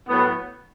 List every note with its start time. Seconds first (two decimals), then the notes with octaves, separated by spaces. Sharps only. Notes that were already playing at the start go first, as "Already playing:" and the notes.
0.08 A2 F#3 B3